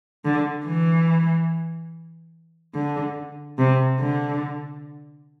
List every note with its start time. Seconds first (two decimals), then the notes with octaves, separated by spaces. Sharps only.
0.25 D3
0.66 E3
2.74 D3
3.58 C3
4.00 D3